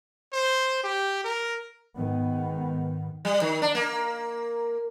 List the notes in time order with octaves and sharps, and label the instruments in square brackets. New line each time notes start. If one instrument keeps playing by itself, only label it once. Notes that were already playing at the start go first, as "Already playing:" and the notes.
[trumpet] C5
G4
A#4
[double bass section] G#2 D#3 B3
[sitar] G3
D#3
D4
A#3